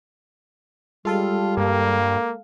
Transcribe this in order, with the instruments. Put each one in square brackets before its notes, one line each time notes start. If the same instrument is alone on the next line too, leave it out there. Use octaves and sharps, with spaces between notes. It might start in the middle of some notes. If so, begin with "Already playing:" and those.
[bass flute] G3 [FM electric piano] G#3 A4 F5 [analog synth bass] F4
[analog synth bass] G2 [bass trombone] A#3